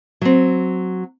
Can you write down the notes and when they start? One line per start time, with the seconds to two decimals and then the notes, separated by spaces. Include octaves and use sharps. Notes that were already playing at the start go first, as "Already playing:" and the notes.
0.21 F#3 C4